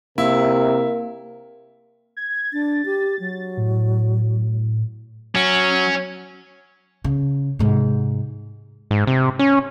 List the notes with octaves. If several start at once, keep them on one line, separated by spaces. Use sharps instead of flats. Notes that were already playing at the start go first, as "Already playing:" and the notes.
C3 A#3 E4 A#4
G#6
D4 A6
G4
F#3
A2
F#3 C#4
C#3
G#2 C3
G#2
C3
C#4